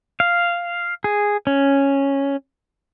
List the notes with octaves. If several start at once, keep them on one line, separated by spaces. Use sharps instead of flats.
F5
G#4
C#4